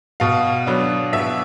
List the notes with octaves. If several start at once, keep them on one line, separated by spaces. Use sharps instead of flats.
B2 F5
F#3 B3 D4
B2 E5